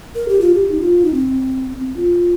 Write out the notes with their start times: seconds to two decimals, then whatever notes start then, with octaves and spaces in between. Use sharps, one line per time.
0.15 A#4
0.28 G4
0.41 F4
0.54 G4
0.71 D#4
0.81 F4
1.05 D#4
1.14 C4
1.79 C4
1.96 F4